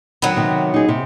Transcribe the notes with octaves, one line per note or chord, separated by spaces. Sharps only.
D#3 F#3 B3
C3 D#3
D#4 G#4
C3